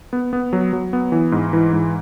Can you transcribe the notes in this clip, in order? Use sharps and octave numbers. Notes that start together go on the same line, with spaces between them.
B3
B3
F#3
F#3
B3
E3
G#2
E3
G#2